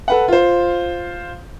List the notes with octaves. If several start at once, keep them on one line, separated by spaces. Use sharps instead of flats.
A4 B4 F#5
F4 C5